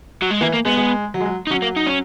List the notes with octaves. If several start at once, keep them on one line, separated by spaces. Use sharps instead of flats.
F#3
G#3
E3 A#3
A#3
G#3 B3
G#3
F#3
G#3
F#3
D#4
F#3 C#4
A#3
D#4
C#4